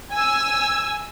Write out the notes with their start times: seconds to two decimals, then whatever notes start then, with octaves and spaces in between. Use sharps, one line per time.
0.13 G#5 E6